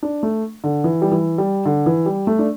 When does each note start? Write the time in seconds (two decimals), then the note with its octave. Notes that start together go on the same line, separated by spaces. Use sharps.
0.03 D4
0.23 A3
0.64 D3
0.84 E3
1.02 G3
1.11 E3
1.38 G3
1.65 D3
1.86 E3
2.06 G3
2.27 A3
2.39 D4